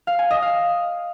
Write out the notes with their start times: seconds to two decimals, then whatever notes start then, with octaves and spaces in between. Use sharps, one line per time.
0.07 F5
0.19 G#5
0.31 D#5
0.42 F5